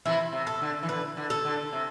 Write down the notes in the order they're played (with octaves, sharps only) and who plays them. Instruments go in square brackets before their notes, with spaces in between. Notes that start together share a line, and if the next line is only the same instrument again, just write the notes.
[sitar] C3 E3 [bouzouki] E4
[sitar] C3
[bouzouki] A4
[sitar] D3
E3
[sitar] D3 [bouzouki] B4
[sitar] D3
[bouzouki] A4
[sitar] D3
C3